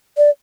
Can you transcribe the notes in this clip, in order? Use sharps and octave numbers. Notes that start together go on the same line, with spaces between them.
D5